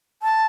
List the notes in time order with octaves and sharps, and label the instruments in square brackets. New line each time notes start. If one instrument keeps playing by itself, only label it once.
[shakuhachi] A5